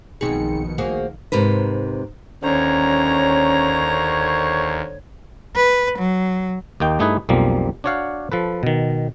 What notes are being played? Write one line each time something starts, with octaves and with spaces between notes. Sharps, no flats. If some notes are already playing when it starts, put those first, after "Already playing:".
B1 B2 D#3 F3 C4 D#4 G#4 C#7
A#3 F#4 G#4 C5
G#2 C3 A#4 B4
D#2 D3 C#4 C5 C#5 A#5
B4
F#3
D#2 A#3 D#4 G5
G2 A3 D#4 E4 G#4 B4
B1 F2 F3 G3 A#3
D4 F#4 C#5 D5 F5 F#5
F3 A4 B4
B2 D#3